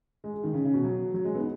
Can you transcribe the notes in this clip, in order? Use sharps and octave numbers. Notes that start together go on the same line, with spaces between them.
G#3
G#3
D#3
C#3
C#3
B2
F#3
F#3
G#3
B3
D#4